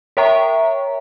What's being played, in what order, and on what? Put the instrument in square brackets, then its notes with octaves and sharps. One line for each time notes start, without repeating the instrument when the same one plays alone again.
[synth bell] A#4 C#5 E5 G5 A#5 C#6